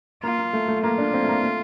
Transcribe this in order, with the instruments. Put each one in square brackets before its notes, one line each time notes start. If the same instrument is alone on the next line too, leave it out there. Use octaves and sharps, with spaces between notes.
[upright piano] A#3 [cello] F4
[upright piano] A#3
A3
A3
[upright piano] A#3 [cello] F4
[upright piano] D4
C4
A3
A#3
A3